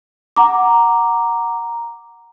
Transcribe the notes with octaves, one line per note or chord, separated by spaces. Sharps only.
F#5 A#5 D6